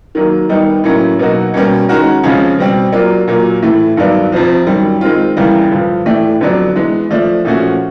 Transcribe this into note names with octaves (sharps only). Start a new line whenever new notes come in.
D#3 F#3 A#3
D#3 G3 B3 D#4
A2 F#3 A#3 C#4
B2 F#3 A#3 D#4 F#4
B2 G3 A#3 C#4
D#3 G#3 C#4 F#4 A#4
F2 C#3 F3 G#3 C#4
B2 G3 C4
F#3 A#3 D4 F4
A#2 F#3 A#3
A2 E3 A3
G2 D#3 F#3 B3 D4
F2 C3 F3
F#2 D#3 G3
D#3 G#3 C4 F4
E2 C#3 E3 G3 A#3
G2 D3 F3
A2 E3 A3 D4 G4
F2 D3 F#3 B3 D4
E3 G#3 B3
F3 A3 D4
A#2 F3 A3 C#4 F#4